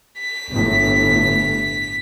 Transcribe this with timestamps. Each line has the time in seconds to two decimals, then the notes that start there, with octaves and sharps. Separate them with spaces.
0.20 B6
0.49 G1 A2